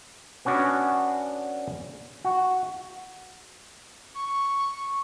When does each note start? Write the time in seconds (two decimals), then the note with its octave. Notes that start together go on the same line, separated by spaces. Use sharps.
0.45 B3 C#4 D4 F#4 D5
2.24 F#4
4.14 C#6